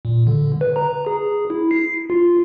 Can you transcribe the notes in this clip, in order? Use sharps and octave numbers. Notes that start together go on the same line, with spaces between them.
A#2
D3
B4
A#5
G#4
E4
C7
F4